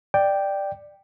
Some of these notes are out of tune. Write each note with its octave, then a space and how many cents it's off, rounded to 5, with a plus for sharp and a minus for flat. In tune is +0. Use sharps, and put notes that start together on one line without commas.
D5 +10 G5 +0